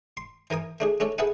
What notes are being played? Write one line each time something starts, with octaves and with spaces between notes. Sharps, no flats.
C6
E3 A#4 G#5 D#6
A3 D4 G#4
A3 C#4 D4 A4
G#4 A4 B4 E5 F#5 G#5